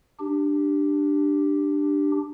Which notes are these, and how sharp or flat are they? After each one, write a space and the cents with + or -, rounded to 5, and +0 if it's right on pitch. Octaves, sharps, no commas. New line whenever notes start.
D4 +10 G4 +0